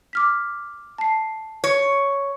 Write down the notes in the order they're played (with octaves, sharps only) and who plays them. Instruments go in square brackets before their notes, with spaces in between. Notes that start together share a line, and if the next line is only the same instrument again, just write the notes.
[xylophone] D6 F6 B6
A5 C7
[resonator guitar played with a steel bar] C#5